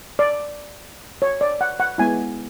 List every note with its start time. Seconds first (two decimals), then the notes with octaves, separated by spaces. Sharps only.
0.19 D5
1.22 C#5
1.41 D5
1.61 F#5
1.80 F#5
1.98 G#3 B3 E4 G#5